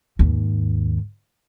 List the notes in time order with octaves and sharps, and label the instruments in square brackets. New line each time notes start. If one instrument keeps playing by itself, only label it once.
[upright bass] D#2 G#2